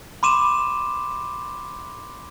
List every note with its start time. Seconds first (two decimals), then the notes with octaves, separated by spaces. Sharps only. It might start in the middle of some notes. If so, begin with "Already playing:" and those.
0.23 B5 C6 D6 D#7 E7